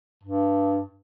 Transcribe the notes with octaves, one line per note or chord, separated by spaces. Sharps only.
G2